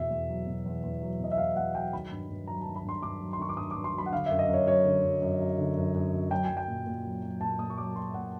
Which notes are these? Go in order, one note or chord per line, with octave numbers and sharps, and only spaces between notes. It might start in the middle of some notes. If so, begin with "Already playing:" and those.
Already playing: E2 B2 E5
E2
F#3
B2
E2
E2
F#3
B2 D#5
E5
E2 F5
E2 F#5
F#3 G5
D#3 B5
G2
G2
F#3 A#5
A5
D#3
B5
G2 C6
G2 D6
F#3
C6
D#3 C#6
D6
G2 D#6
G2 D6
C6
F#3 B5
F#5
D3 F5
F#2 E5
D#5
F#2
C#5
F#3 C#5
D3
F#2
F#2
F#3
D3
F#2
F#2
F#3
F#3 G5
G#5
F#3
G5
A#2
A#2
F#3
F#3
A#2 A5
A#2 D#6
C#6
F#3 D6
F#3 C6
A#2 F#5